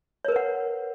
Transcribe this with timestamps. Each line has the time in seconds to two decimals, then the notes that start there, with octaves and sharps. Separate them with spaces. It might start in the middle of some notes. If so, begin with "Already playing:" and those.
0.25 C#5
0.28 A#4
0.32 B4
0.36 F#5